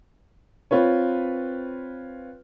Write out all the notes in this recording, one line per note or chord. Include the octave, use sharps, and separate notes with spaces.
C4 F4 B4 C#5